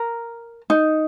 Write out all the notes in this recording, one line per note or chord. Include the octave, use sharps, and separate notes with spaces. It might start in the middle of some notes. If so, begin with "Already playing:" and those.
Already playing: A#4
D#4